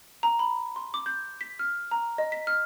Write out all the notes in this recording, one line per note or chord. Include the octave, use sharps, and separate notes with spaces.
A#5
B5
C6
D6
G6
B6
F6
A#5
D#5
B6
F6